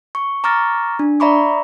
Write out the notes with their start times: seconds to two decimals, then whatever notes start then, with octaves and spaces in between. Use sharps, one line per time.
0.15 C#6
0.44 A#5 C#6 D6 F6 A6 A#6
0.99 D4
1.20 D5 E5 A#5 B5 C#6 D6